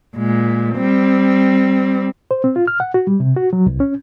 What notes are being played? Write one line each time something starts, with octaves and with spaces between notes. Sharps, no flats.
A#2 G#3
G3 C4
C5
C4
F4
F6
F#5
F#4
G3
C3
F#4
F#3
C2
C#4